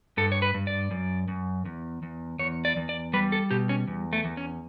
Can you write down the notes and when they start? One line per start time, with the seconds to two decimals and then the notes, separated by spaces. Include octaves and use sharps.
0.17 G2 A4
0.32 C#5
0.42 B4
0.54 G2
0.67 D5
0.91 F#2
1.28 F#2
1.65 E2
2.03 E2
2.39 E2 C#5
2.65 D5
2.77 E2
2.89 D5
3.13 G3 B4
3.32 A4
3.51 B2 G4
3.69 C#4
3.88 E2
4.13 A3
4.25 E2
4.37 C#4